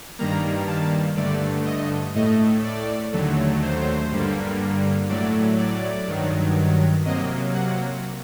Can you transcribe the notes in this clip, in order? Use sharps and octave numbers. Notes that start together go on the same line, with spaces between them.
G2 D#3 G3 A#3 A#5
A5
G2 D3 A3 D5
D#5
A2 A3 D#5
D5
D#2 D3 F#3 A3
C5
G2 D3 G3 A#3
A2 F#3 A3 D5
D5
G2 D#3 F#3
C3 F#3 A#3 D#5
F#5